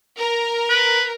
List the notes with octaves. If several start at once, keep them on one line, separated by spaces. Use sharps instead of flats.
A#4
B4